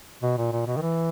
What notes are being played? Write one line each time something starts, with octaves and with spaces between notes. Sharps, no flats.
B2
A#2
A#2
B2
D#3
E3